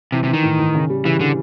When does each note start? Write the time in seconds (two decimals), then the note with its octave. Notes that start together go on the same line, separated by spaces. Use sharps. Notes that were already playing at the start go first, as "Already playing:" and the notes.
0.12 C3 E3
0.24 C3
0.28 E3
0.33 D#3
0.43 A2
0.59 A2
0.74 C#3
0.90 G3
1.04 C#3 E3
1.20 D3 E3